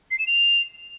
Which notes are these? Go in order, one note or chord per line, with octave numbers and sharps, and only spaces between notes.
C7
E7
F7